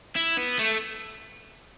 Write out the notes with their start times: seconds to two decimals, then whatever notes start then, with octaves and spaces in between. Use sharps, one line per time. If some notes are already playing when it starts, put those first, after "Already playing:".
0.16 E4
0.38 B3
0.59 A3